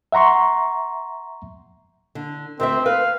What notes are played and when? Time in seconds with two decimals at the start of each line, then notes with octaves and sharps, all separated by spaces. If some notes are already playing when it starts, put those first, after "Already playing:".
0.12 E5 F#5 A#5 C6 C#6
2.15 D3
2.60 D2 C4 C5 E5
2.86 B4 F5